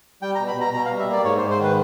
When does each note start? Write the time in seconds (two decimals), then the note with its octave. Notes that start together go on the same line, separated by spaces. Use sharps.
0.22 G3 G5
0.35 A#5
0.40 B2
0.48 B5
0.56 B2 A#5
0.73 B2 A#5
0.86 F5
0.91 G3
0.99 E5
1.08 A#3 D5
1.25 G#2 C#5
1.38 C5
1.42 G#2
1.50 C5
1.60 D#3 B4